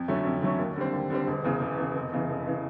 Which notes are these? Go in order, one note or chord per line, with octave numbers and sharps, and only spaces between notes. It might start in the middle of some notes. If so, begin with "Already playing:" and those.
Already playing: F2
D3 F#3 A3 C#4
F2
D3 F#3 A3 C#4
D#2
D3 G3 C4
D#2
D3 G3 C4
E1
E2 C#3
E1
E2 C#3
F1
E2 C#3 E3
F1
C#3 E3